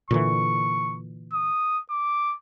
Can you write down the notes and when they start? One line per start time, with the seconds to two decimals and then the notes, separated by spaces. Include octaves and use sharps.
0.11 A#2 D3 E3 C#6
1.33 D#6
1.91 D6